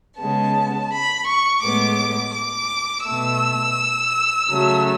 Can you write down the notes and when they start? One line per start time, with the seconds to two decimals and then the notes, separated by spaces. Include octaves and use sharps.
0.19 C#3 G#3 B3 A5
0.91 B5
1.26 C#6
1.62 A2 G#3 B3 D6
2.34 D6
3.05 B2 A3 E6
4.48 C#3 F#3 A3